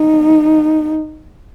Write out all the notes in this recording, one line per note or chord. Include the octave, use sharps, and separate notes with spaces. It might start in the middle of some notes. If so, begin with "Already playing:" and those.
Already playing: D#4